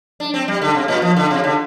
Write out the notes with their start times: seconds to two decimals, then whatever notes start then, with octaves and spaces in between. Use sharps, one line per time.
0.20 D4
0.34 C4
0.48 G3
0.62 D3
0.75 C3
0.88 A#2
1.02 F3
1.16 D3
1.31 C3
1.44 D3